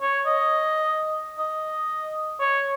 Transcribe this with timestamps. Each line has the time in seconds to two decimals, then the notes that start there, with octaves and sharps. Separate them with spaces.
0.02 C#5
0.26 D#5
1.38 D#5
2.40 C#5